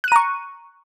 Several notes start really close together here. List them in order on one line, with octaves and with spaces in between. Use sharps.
F#6 D#7 A#5 C#6